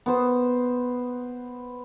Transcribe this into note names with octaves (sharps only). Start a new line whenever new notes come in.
B3 C5